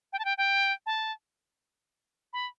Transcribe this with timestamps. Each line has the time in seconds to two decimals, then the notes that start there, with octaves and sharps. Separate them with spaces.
0.13 G5
0.19 A5
0.25 G5
0.38 G5
0.86 A5
2.33 B5